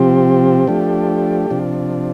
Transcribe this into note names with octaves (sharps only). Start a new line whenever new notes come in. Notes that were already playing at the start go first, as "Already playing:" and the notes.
Already playing: C3 F3 C4 G4
F3 A3 D4
C3 F3 D4